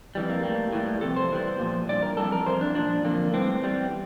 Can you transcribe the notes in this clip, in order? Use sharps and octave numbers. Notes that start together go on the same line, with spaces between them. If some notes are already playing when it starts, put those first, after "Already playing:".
F2 E3 G3
A#3
A2 G3
A2 E3 G3
F2 C3 A4
C5
E2 E3 G3
A#2 F3
G2 E3 D5
A#4
F2 E3 G3 A4
A#4
F2 E3 C5
D4
A#2 F3 D4
F2 D3 F3 A#3
A2 E3 G3 C4
E2 E3 G3